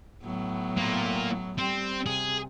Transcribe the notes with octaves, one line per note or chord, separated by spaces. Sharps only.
A2 F#3 B3
A#3 F4
G3 C4
C3 G#4